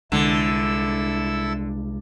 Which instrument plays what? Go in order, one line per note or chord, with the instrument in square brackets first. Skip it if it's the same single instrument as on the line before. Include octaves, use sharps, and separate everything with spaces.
[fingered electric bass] C2 G#3 [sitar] D3 [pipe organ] E4 A4 E6